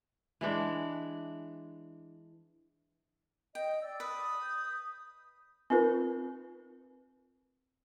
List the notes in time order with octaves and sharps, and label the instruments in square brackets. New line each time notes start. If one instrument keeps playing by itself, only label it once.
[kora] E3 G#3 D4
[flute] D#5 [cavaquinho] G5
[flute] D5 [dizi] E6
[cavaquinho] B4 [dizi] D#6
[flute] G6
[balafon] C4 D#4 F4 A#4 B4